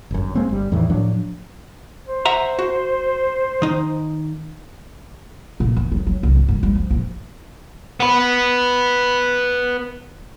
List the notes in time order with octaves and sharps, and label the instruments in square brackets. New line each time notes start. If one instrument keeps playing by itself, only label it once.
[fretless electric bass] G1 F#2
G#3 A#3 C4
G1 G3
E2 A2 D#3 E3
A2 F3 F#3 D4
[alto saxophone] C5
[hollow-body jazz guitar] E5 F#5 A#5
F#4
D#3 D#4
[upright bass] A#2
E2
F#3
F#3
C2
G#2
G2
G3
F3
A#1
[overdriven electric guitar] B3 B4